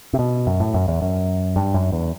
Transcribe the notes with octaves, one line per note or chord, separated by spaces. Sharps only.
C3
B2
F#2
A2
F#2
E2
F#2
G2
F#2
E2